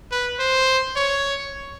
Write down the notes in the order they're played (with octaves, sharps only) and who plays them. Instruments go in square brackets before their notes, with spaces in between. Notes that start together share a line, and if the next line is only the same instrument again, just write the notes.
[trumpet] B4
C5
C#5